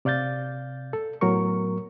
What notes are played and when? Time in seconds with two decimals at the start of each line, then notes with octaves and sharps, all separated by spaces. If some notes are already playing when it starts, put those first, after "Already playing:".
0.05 C3 D5 F5 G6 A6
0.93 A4
1.21 A2 F#3 B3 A#4 C#6